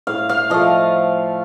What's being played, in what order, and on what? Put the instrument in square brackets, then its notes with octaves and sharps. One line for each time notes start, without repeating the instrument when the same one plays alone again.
[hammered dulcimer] A2 F5
F5
F3 A3 D#5